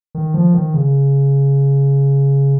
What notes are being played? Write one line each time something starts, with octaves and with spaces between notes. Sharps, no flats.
D#3
F3
D#3
C#3